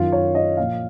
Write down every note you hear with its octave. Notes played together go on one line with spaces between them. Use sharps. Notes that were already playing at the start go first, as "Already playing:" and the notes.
Already playing: F#2 D#3 F4
C#5
D#5
A#2 F3 F5